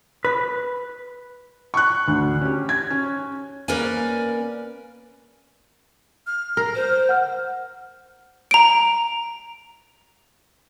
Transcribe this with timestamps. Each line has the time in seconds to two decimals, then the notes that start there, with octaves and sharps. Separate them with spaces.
0.25 B4
1.74 C#6 F#6
2.08 D2
2.41 C#4 G4
2.69 G#6
2.90 C#4
3.68 A#3 C#4 A#4 B4 D5 G#5
6.27 F6
6.57 A#4
6.75 C5
7.09 F#5 F6
8.51 A#5 D7